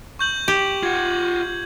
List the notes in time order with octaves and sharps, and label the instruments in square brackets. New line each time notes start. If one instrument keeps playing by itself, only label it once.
[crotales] C#6 G6 F#7
[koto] G4
[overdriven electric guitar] F4 F#5 [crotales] G#6